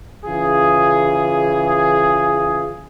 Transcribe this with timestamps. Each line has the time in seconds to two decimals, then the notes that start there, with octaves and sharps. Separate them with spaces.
0.25 C#3 E3 F4 G#4